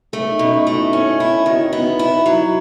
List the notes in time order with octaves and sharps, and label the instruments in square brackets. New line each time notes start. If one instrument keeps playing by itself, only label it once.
[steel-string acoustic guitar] A3 [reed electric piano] G#4
[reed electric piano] D#4
[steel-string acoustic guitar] B2 [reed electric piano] C#4
[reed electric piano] D#4
[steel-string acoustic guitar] A3 [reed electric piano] E4
[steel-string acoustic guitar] C#4
E4
[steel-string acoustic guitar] D#3 [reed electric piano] F#4
[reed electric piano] E4
[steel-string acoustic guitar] B3 [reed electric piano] D#4
[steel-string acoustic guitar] E4
F#3